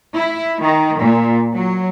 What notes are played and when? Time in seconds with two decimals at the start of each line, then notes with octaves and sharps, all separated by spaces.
0.15 E4
0.62 D#3
0.98 A#2
1.54 F#3